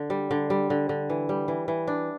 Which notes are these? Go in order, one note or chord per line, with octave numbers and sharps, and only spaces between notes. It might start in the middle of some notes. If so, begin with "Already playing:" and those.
Already playing: D3
G3
D3
G3
D3
D3
E3
G3
E3
E3
D4